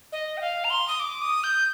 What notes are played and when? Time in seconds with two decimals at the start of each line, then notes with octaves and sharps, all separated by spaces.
0.12 D#5
0.37 G5
0.41 F5
0.64 A#5
0.70 C6
0.88 D#6
1.00 D6
1.21 D#6
1.44 G6